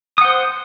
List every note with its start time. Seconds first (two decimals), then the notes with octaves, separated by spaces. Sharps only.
0.18 D#6
0.21 F#5
0.25 C5